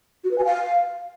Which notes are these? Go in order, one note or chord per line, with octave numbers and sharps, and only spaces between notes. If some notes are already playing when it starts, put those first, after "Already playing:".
F#4
B4
G#5
F5